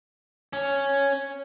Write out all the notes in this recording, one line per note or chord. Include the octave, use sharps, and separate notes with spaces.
C#4